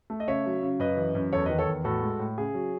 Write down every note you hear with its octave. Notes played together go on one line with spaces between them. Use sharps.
A3
D#5
C#3 C#5 E5
F#3
C#3
F#2 B4 D#5
E3
F#2
E2 A4 C#5
D#3 B4 D#5
A4 C#5
E2
A2 F#4 A4
G#3
A2
C#3 G#4
F#3